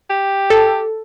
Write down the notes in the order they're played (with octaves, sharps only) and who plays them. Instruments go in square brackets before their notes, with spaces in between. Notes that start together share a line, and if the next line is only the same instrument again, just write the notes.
[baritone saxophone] G4
[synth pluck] A4